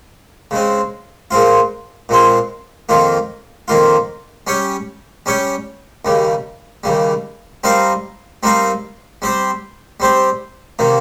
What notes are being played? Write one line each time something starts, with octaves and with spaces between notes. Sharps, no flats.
C#3 G#3 C4
A#2 G#3 C4 F4
A#2 G#3 C4 F4
F2 D#3 A#3 F4
F2 D#3 A#3 F4
G3 C#4 G4 C#5
G3 C#4 G4 C#5
D#2 C#3 G3
D#2 C#3 G3
G3 C4 D#4 A#4 F5
G3 C4 D#4 A#4 F5
G3 C4 G4 C5
G3 C4 G4 C5
C3 D#3 A#3